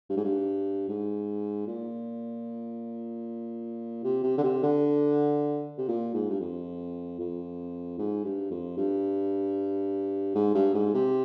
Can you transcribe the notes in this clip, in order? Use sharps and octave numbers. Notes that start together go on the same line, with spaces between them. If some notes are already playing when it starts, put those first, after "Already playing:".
G2
G#2
G2
G#2
A#2
C3
C3
D3
C3
D3
C3
A#2
G#2
G2
F2
F2
G#2
G2
F2
G2
G#2
G2
G#2
C3